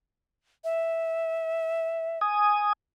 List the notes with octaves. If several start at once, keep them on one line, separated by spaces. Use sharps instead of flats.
E5
G#5 D#6